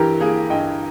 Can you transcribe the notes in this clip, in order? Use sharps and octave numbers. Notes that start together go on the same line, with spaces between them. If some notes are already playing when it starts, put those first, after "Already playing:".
Already playing: G2 E3 G4 A#4
A#3 G#4
G2 D#5 G5